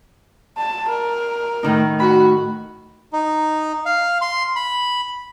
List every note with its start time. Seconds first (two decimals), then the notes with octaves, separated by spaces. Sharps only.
0.57 A5
0.88 A#4
1.63 A2 D#3 D#4
2.00 F#4 B5
3.13 D#4
3.86 F5
4.21 C6
4.56 B5